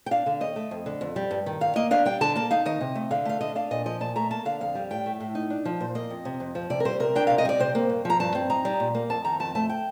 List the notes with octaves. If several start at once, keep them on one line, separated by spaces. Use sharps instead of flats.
G5
D4 F5
D3
D#2 D#5
A3
F2
D3
F2
G3
G2
D#3
G2 F5
A#3 D#5
D4 F5
G3 G5
D3 A5
A#3 A5
D#4 F5
D#3 D#5
C3
A3
D3 F5
A3 F5
D3 D#5
D4 F5
A#2 D#5
F3 D#5
A#2 A5
A3 A#5
A#3 A5
D3 F5
F2 F5
G3
A2 G5
A3
A2
D#4
D4
F3
A#2 C5
A#3 D#5
F2
C3
F2
F3
C3 D5
A#4
G3 C5
C3 A#4
D4 G5
C3 F5
D#5
G3 D5
C3 C5
A#3
G2
F3 A#5
G2 A5
C4
D#4 A#5
G3
A#2
A#3
F2 A5
D#3 A#5
F2 A5
A3 A5
G5